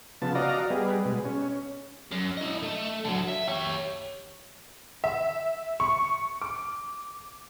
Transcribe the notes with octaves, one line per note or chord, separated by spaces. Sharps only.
C#3 F3 B3 A5
F#4 D5 D#5 F5 A#5
G3 B3 G#4
B2 G#3
C#4
F#2
E4 D#5
A3
D3 F#3
E5
G4 C#5
E5
C#6
D6